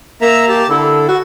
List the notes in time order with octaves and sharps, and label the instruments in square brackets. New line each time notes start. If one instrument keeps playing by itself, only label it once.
[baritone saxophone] A#3 [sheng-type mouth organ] E5 A#5 E6
[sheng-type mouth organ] G4 A5
[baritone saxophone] D3 [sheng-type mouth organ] E4 A4
[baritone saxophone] F#4